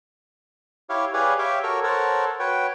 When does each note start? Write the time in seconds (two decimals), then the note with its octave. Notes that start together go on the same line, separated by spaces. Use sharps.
0.89 E4 G4 C#5 F5
1.14 G4 G#4 B4 C#5 D5 F5
1.39 G4 C#5 E5 F5 G5
1.63 F#4 A4 A#4 C#5
1.84 A4 A#4 C5 C#5 F#5 A5
2.40 F#4 B4 C#5 G5